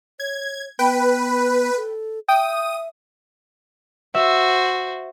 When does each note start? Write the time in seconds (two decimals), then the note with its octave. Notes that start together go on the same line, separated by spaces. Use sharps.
0.20 C#5 G#6
0.79 B3 B4 G5
1.77 A4
2.28 E5 G5 D#6
4.15 F#4 C5 E5